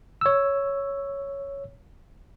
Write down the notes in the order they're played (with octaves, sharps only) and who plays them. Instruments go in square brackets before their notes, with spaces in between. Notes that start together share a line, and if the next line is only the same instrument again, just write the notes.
[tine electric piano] C#5 E6